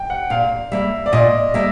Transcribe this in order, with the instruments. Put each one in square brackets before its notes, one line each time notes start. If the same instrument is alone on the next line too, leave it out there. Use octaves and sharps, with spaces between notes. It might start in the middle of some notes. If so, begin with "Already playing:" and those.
Already playing: [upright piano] G5
F#5
[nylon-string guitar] A#2 [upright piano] F5
[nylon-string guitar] G3 A#3 [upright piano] E5
[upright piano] D5
[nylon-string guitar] A#2 [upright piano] D#5
[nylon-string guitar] G3 A#3 [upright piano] E5